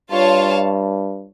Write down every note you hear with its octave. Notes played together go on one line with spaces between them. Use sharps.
G2 F4 C#5 F5 A5